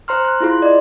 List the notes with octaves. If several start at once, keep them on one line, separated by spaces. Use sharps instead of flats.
C5 A#5 C6 F6
F#6
E4 F4 G#4 C6
D5 D#5